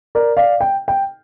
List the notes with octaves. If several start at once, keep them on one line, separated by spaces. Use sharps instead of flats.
A#4 D5
D5 F5
G5
G5